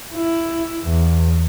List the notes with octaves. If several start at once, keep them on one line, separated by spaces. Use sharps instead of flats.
E4
E2